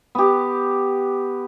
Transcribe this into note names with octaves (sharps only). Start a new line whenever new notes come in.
B3 G4